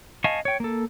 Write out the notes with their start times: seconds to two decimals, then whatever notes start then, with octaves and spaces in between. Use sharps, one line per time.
0.24 D#5 F5 G#5 A5 C#6
0.45 C#5 G5
0.60 A#3 A4